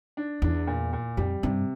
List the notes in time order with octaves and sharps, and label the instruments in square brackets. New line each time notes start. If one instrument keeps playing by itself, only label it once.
[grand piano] D4
[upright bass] E2 [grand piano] D4
[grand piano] A#2
A#2
[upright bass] F2 [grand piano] G3
[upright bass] G2 [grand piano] C3